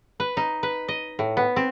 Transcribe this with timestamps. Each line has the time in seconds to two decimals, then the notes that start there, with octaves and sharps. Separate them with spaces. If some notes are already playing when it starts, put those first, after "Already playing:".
0.20 B4
0.37 D#4
0.63 B4
0.88 D#5
1.19 A2
1.37 B3
1.56 C4